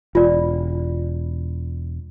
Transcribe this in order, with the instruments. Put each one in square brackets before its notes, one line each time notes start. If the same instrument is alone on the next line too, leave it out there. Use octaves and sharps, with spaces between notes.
[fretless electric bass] E1 [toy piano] F4 D5